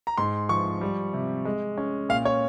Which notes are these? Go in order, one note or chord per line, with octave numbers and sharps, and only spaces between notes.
A#5
G#2 C6
F3 C#6
G3
C3
G#3
C#4
A#2 F5
C#5